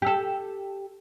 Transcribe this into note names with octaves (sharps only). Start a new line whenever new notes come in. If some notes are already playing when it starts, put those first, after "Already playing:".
G4 A4